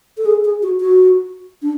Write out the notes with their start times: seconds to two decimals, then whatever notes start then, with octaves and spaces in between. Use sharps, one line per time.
0.18 A4
0.26 G#4
0.44 G#4
0.62 F#4
0.80 F#4
1.62 D4